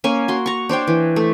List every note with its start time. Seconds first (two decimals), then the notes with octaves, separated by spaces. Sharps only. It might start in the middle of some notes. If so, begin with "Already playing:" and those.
0.04 A#3 C#4 C#5 G#5
0.28 F#4 C6
0.46 A#5 C#6
0.69 D4 C5 C#5 G5
0.87 E3
1.16 A3